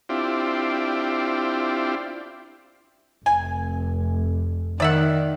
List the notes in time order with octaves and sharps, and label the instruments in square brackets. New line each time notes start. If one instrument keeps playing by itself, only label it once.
[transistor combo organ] C4 D4 E4 F4 G4
[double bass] F1 [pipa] G#5
[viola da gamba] D#3 [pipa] D5 E5 F#5